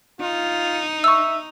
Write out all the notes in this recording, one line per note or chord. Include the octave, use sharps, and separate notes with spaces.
D#4 F4
E5 C#6 E6